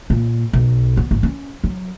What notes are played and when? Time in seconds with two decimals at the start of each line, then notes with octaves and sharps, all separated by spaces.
0.10 A#2
0.53 B1
0.97 B3
1.11 G#1
1.23 C#4
1.64 F#3